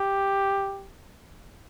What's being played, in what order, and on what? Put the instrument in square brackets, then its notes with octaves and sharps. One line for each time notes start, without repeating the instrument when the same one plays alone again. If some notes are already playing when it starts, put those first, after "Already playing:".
Already playing: [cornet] G4